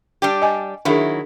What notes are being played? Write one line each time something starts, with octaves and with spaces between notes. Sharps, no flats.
G3 D4 G4
D#5 G#5
D#3 F#3 D4 E4 G#4 A#4